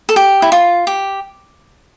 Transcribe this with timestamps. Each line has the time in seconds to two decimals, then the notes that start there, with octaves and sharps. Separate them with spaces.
0.09 A4
0.16 G4
0.42 E4
0.52 F4
0.87 G4